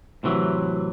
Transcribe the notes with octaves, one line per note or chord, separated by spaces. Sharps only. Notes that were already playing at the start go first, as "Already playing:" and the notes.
A2 C3 E3 F#3